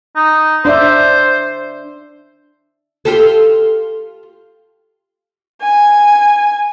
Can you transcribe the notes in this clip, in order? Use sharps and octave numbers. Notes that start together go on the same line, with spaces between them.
D#4
D4 C5 D5 E5
F4 G4 A4
G#5